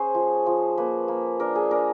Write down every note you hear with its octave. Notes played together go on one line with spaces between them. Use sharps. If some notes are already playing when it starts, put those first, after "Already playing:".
Already playing: C#4 G#4 C5
F3
F3
A#3 B4
A#3
D4 A#4
G#4
D4 A#4